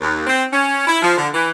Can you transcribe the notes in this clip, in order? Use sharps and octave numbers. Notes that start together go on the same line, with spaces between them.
D#2
C4
C#4
E4
F3
D3
E3